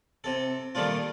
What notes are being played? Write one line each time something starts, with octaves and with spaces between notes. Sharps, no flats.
C3 A4
A#2 D#3 G3 A3 D4 F4